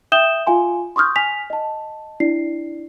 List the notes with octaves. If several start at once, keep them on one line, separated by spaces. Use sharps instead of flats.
E5 G5 D#6 G6 E7 G7
F4 F5 G#5 C6
C6 C#6 D#6 F6 G6
G#5 B6 F7
D#5 A5
D4 E4 D5 C7